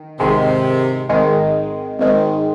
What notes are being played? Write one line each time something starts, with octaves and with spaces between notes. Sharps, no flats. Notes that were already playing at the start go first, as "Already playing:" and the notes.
Already playing: D#3
G#1 G#2 C3 D#3 G#3
G#1 G#2 D#3 G#3
G#1 G#2 D#3 G#3